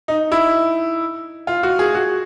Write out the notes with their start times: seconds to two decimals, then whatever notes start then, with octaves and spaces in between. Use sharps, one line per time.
0.08 D#4
0.32 E4
1.47 F4
1.63 F#4
1.79 G#4
1.95 F#4